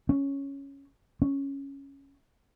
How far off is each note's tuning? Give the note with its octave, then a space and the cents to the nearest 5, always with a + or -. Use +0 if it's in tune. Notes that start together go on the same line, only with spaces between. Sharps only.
C#4 +0
C#4 -5